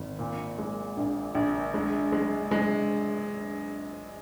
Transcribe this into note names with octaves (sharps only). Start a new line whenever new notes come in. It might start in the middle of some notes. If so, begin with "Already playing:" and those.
Already playing: G#1
A#2
G#3
A#1
A#1
G#3
G#3
G#3